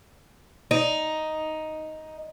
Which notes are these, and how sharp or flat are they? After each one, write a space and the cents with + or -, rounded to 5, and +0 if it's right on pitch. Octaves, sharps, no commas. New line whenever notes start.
D#4 +5